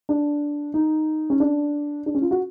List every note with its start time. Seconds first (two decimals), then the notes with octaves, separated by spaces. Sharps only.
0.09 D4
0.74 D#4
1.30 C#4
1.40 D4
2.06 D4
2.15 C#4
2.22 F4
2.31 F#4